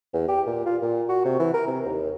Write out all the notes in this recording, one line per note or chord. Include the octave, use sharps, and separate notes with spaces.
E2
G4
A#2
F4
A#2
F#4
C3
E3
A#4
C3
D#2